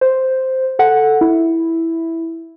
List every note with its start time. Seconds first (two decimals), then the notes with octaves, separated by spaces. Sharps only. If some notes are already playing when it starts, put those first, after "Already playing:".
0.01 C5
0.79 A4 F#5
1.21 E4